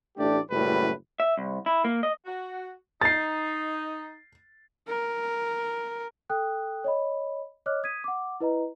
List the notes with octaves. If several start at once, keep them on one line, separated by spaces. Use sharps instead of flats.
A1 A3 D4 G4 D5
F#1 F#2 A2 G3 B4
E5
C2
E4
A#3
D#5
F#4
D#4 A6 C7
A#4
A4 G5 D#6 F#6
C#5 D#5 B5
C#5 D#5 D6 F6 F#6
D#6 G#6 B6 D#7
F#5 D6
E4 B4 D#5 A#5